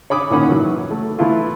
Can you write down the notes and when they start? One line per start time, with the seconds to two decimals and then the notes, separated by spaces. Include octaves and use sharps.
0.10 C#5 B5 D6 D#6
0.30 A#2 D#3 C#4 F#5 B5
0.47 D#3 E3 F#3
0.90 A3
1.18 E3 A3 B3 E4 F4 A4